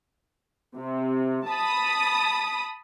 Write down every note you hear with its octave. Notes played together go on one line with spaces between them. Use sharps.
C3
A5 B5 D#6